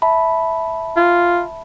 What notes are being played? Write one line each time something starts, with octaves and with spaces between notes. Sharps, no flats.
E5 A5 B5
F4